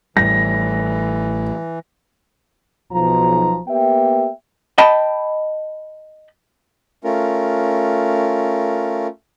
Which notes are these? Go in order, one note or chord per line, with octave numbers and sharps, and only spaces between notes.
A1 A2 E3 G3 A#6
B1 F3 A#5
A#3 B3 G4 E5 G5
D#5 G5 A5 B5
A3 C#4 F4 A#4